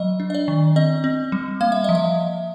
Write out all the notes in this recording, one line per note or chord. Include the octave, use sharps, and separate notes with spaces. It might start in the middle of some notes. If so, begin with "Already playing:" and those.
Already playing: F#3 G3 D#5
D4
D#5
D5
D#3
C4 D#5
C4
G3
A#3 F5
E5
F3 D#5
E5